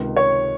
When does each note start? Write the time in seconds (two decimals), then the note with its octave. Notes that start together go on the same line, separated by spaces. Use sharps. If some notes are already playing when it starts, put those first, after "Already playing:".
Already playing: C#2 C3 D#3
0.17 C#5